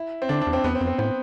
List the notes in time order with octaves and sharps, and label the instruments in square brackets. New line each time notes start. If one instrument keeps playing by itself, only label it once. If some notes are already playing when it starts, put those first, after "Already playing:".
Already playing: [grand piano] E4
C4
[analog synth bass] D3 [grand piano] D4
[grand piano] D4
[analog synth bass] E2
[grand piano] C4
[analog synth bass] E2 [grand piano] B3
[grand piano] C4
[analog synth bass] F2
[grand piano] C4
[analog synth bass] A2 [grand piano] C4